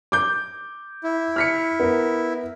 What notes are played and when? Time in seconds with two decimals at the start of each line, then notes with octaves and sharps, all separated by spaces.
0.12 D6 G6
1.03 E4
1.36 F6 B6 C#7
1.80 B3 A#4